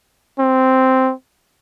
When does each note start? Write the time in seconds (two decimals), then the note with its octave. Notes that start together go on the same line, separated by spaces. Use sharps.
0.39 C4